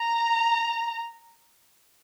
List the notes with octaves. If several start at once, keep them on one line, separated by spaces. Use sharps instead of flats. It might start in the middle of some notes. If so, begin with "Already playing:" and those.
Already playing: A#5